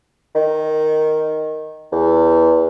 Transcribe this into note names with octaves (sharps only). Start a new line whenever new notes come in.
D#3
E2